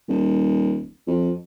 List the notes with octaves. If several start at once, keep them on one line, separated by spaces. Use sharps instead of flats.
D#1
F2